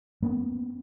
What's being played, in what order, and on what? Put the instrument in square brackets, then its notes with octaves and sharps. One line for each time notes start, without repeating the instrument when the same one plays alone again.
[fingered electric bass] A#3 B3 C#4